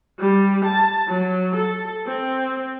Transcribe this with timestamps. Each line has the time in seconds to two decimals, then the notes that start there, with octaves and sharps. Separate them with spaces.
0.19 G3
0.65 A5
1.08 F#3
1.56 A4
2.06 C4